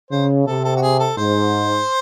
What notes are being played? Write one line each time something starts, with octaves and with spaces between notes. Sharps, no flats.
C#3 C5
C3 A4
A4
F#4
G#4
A4
G#2 C5